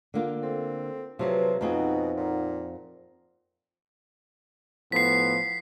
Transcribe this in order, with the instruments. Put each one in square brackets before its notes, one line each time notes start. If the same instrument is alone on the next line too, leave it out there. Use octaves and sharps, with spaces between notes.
[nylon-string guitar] D3 A#3 F4
[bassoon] C4 [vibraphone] A4
[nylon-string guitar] C3 F#3 [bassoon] F3 [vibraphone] F#4 G#4 B4
[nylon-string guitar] F2 C4 G#4 [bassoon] B2 [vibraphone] D#4 F#5 A#5
[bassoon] A#2
[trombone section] A2 F3 B3 [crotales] B6 C7